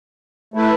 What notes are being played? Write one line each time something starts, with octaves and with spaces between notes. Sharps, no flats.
A3 E4 B4